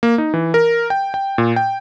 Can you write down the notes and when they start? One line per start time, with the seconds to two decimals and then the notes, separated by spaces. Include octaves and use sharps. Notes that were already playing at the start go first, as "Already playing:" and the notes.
0.03 A#3
0.18 D#4
0.34 E3
0.54 A#4
0.90 G5
1.14 G5
1.38 A#2
1.56 G5